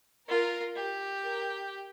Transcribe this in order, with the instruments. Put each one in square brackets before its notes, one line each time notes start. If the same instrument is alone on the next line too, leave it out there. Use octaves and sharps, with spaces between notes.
[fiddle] F4 [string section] A#4
[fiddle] G4
[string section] A#4